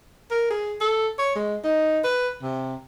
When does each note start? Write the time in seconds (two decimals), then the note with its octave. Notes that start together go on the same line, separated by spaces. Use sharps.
0.31 A#4
0.51 G#4
0.81 A4
1.19 C#5
1.36 G#3
1.64 D#4
2.04 B4
2.42 C3